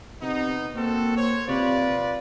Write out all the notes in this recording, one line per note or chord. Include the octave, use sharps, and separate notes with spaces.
C3 B3 D#4
A#3 C4 F#4 A4
C5 C#5
C3 F4 B4 D5